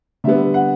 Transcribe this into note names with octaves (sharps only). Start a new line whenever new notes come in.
D3 G3 B3 E5
F#5